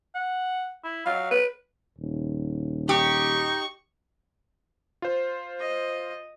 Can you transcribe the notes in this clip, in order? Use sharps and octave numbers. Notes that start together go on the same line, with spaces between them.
F#5
E4
F#3 F5
B4
D#1
D#4 G4 C#6
F4 C5
D#5